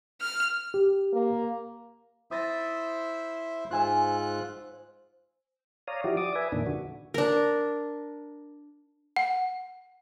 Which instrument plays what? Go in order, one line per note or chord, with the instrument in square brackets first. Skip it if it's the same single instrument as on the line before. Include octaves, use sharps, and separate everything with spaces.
[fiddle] F6
[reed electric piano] G4
[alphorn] A#3
[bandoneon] E4 C5 E5 [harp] D#6 A6 A#6
[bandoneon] G#2 F4 F#6 [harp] C5 G#5 E6
[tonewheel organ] C#5 D5 F5 A#5 D#6
F3 E4 F#4 G4 D5
D5 D6 D#6
B4 E5 G#5
F2 A#2 D#3 D4
D3 F#4
[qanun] D4 A#4
[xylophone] F#5